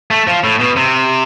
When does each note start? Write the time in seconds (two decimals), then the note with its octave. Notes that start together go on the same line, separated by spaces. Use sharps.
0.10 A3
0.27 F3
0.44 A2
0.60 B2
0.76 C3